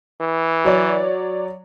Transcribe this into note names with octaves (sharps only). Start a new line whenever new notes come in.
E3
F#3 C#5 D5